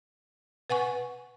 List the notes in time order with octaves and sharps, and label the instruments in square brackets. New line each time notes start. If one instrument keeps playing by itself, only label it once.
[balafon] B4 F#5 G#5 C#6